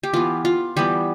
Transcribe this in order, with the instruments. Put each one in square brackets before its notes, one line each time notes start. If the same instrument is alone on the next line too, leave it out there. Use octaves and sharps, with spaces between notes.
[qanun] G4
E3 B3 F4
F4
E3 G3 B3 G4